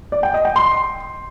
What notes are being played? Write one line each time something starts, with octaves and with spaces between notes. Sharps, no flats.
D5
G5
D#5
G5
C6